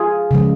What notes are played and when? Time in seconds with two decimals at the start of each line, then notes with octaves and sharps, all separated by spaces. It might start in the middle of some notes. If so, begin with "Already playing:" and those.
Already playing: F4 G#4
0.31 C#3 F3 G#3